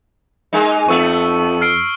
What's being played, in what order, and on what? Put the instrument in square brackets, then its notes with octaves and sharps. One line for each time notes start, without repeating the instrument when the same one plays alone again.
[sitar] G#3 A#3 D#4
[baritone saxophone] F2 [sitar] A3 B3 [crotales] C#6 E6
[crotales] F6 C7 D7